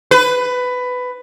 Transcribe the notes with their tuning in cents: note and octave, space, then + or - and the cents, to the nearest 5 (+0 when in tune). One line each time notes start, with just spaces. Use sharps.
B4 +15